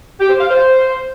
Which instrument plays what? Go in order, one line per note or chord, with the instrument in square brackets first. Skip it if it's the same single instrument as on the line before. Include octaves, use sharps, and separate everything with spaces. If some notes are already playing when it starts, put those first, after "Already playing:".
[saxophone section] G4
C5
F5
C5